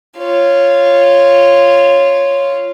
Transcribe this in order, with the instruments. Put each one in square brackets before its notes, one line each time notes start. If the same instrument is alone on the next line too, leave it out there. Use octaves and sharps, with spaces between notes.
[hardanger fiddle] F4 C#5